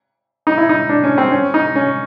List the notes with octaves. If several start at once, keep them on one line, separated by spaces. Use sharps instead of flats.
D#4
E4
D#4
D4
C#4
C4
C#4
D#4
C#4